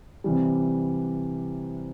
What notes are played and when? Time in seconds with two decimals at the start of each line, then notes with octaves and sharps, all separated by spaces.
0.24 C3 E3 G3